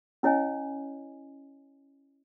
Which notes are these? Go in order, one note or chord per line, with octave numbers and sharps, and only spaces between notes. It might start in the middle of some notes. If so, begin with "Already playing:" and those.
C#4 E4 C#5 D#5 G#5